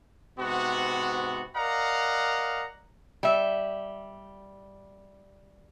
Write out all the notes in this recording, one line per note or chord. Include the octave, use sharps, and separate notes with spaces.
G#2 C3 B3 F#4
A#4 D5 D#5 F5 F#5 A#5
G3 E5